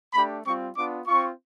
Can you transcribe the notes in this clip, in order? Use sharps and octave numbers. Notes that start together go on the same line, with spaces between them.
A3 D4 G4 B5
G3 C4 F4 C#6
B3 D4 F4 D6
C4 F4 C#6